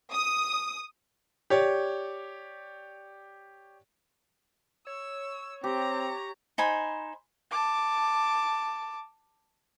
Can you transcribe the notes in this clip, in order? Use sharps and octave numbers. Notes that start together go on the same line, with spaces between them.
D#6
G4 C#5 D5
C#5 E6
C4 G4 A#5
D#4 C5 G#5 B5
A5 D6